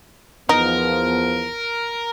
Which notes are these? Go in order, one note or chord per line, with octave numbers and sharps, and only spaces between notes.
E2 F3 B3 D#4 A#4